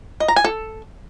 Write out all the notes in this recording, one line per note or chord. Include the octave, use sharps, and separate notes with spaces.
D#5
A#5
G#5
A4